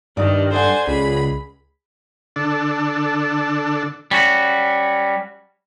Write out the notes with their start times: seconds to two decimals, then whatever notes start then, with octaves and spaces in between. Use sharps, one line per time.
0.17 G2 D#3 D5 D#6
0.51 A4 C5 D5 F#5 G#5
0.87 C#2 G#4 B5
2.36 D3 D4 A4
4.11 G3 C#4 F#4